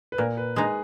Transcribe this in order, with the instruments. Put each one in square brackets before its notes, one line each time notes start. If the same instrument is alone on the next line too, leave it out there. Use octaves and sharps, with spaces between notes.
[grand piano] B4
[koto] A#2 [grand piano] A#4
[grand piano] B4
[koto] G#3 D#4 [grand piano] G#4